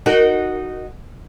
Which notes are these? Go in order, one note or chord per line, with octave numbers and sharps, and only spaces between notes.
D#4 F#4 A#4